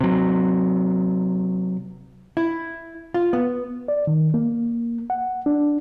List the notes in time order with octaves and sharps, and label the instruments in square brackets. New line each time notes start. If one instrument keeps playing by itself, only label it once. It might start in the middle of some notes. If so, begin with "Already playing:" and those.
[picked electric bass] C3 F#3
[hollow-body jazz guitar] E4
F4
B3
[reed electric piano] D5
D#3
A#3
F#5
D4